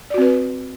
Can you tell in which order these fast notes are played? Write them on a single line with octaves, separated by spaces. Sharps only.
D5 F#4 C4 B4